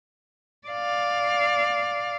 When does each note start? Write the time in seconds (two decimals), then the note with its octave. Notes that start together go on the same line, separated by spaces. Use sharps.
0.68 D5 F5